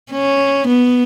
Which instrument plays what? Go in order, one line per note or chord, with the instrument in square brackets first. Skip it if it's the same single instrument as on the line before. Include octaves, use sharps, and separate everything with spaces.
[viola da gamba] C#4
B3